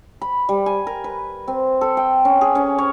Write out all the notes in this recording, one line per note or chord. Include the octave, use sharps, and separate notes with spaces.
B5
G3
G#5
A#4
B4
C4
A4
G5
C#4
G#4
C#4
C#5